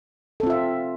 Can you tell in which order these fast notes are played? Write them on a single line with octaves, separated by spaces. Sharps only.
A4 C4 F4 E5